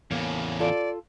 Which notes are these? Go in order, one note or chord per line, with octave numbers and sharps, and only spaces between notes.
E2 A2 C#3 A#3
F4 A4 D5